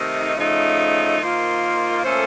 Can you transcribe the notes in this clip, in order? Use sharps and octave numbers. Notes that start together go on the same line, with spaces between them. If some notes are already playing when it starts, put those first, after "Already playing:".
Already playing: C3 D#3 A3 D#4 A4
C#3 F3 A3 D#4
D#3 A#3 F4 C5
A#2 A3 C#4 A4 C5